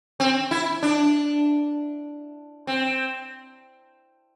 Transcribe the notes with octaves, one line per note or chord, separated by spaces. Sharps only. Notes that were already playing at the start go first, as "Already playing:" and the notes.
C4
E4
D4
C4